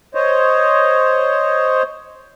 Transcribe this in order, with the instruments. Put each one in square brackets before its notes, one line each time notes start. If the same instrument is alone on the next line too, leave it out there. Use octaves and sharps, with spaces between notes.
[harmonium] C5 C#5 D#5